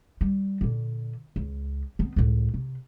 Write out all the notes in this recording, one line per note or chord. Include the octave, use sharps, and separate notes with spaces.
G3
A#2 D3
C#2
B3 C4
C#2 A2
C3